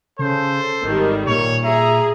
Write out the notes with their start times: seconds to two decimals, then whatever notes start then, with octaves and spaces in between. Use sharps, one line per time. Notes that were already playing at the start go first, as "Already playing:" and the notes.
0.19 C#3 A4 C5
0.83 G#1 D#3 G3
1.27 A#2 C#5
1.64 G#4 E5 A#5